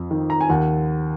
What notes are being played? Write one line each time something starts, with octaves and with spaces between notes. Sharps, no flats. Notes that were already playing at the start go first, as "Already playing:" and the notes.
Already playing: F2
D#3
A#5
G#5
D#2 F#5